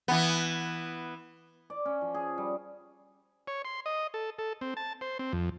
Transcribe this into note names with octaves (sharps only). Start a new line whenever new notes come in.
E3 B3
D5
C#4
F3
G#4
G3
C#5
C6
D#5
A4
A4
C4
A5
C5
C4
F2